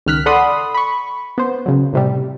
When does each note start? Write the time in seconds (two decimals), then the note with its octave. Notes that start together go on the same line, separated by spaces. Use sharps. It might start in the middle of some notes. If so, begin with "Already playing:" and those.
0.06 C#2 D#3 F6 F#6 B6
0.26 A4 D5 F#5 B5 C6 D#6
0.74 B5 C#6
1.38 B3 C5
1.66 C#3 F#3
1.93 A2 C3 G3